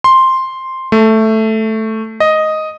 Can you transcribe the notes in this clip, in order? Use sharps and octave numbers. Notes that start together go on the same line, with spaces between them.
C6
A3
D#5